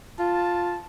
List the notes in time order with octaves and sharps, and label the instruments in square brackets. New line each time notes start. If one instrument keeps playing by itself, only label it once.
[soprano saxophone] F4 [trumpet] A5